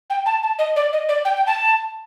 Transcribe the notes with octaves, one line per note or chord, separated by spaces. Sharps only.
G5
A5
A5
D#5
D5
D#5
D5
G5
G5
A5